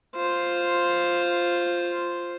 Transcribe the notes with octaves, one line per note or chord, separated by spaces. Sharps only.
F4 C5